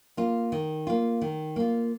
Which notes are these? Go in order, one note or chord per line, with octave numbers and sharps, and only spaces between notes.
A#3 F4
D#3
A#3 F4
D#3
A#3 F4